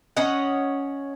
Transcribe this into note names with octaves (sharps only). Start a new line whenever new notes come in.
C#4 C#5 D#5 F#5